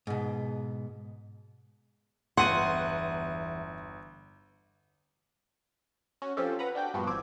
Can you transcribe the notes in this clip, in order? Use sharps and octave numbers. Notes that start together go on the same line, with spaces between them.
G#2 B2
G1 E2 F#5 C6 D#7
C#4 F#4
F3 C4 C#4 F4 G4 A4
B4 F#5 A#5 B5
D4 F#4 G5 D6
G2 A#2 F3 G3 B3 F#4
G1 E3 C4 D6 G#6